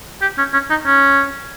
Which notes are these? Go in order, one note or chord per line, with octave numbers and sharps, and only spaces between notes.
G4
C#4
C#4
D#4
C#4